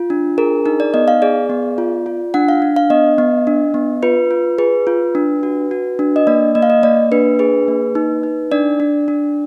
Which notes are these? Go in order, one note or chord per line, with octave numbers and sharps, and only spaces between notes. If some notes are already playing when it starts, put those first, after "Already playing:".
Already playing: F4
D4
G#4 A#4
D#4 A#4
D5
B3 D#5
F5
G#4 D5
B3
F4
F4
D4 F#5
F5
D4
F5
B3 D#5
B3
D4
B3
F4 B4
F4
G#4 B4
F4
D4
F#4
F#4
D4
D#5
A#3 D5
A#3 D#5
F5
D#5
A#3 D5
D4 B4
G#4 B4
A#3
D#4
D#4
D4 D5
D4
D4